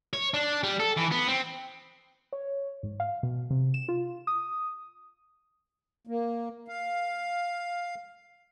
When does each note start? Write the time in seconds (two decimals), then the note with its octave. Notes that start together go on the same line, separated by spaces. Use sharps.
0.13 C#5
0.34 D4
0.63 G3
0.80 A4
0.97 E3
1.12 B3
1.28 C4
2.33 C#5
2.83 G#2
3.00 F5
3.23 B2
3.50 C3
3.74 E7
3.88 F4
4.27 D#6
6.07 A#3
6.68 F5